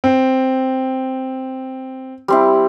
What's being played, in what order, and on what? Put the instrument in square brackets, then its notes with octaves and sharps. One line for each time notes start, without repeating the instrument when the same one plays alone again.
[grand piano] C4
[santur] G3 C4 E4